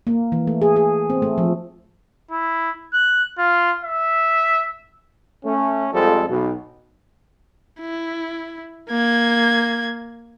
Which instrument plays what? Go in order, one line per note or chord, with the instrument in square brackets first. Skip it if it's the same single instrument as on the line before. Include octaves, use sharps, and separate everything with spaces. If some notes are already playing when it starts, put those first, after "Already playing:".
[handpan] A#3
E3
A3
G#4
G#4
C4
A3
F3
[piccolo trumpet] E4
F#6
F4
E5
[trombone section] A3 C#4
F2 F3 G3 G#3 A4
B1 B2
[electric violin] E4
A#3 G#6